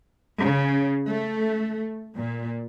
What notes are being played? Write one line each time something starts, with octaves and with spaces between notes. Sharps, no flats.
C#3
A3
A#2